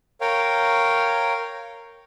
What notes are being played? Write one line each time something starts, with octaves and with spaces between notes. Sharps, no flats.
A#4 C#5 F5 G5